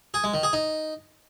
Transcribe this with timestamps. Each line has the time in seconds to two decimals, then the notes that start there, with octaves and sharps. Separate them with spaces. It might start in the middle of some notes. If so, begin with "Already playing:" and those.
0.14 G#4
0.24 G#3
0.34 D#3
0.43 G#4
0.53 D#4